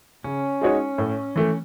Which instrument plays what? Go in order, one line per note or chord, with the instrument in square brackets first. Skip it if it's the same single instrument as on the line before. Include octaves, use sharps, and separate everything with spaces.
[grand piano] C#3 [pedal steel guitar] C#4
[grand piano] G#3 D#4 F#4 C#5
A2
E3 A3